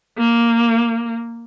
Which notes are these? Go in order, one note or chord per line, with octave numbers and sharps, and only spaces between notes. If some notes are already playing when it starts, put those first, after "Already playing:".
A#3